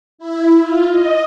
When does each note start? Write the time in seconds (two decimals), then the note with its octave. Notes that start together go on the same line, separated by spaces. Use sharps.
0.18 E4
0.61 F4
0.90 D#5